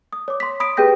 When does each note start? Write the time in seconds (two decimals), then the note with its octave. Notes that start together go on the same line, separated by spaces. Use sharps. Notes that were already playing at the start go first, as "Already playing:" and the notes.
0.13 D#6
0.28 C#5 D6
0.40 C6 B6
0.60 B5 D#6 B6 D7
0.77 G4 G#4 B4 G5 G6 A#6